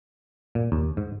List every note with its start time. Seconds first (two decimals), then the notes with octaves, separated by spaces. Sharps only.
0.55 A#2
0.72 D#2
0.97 G#2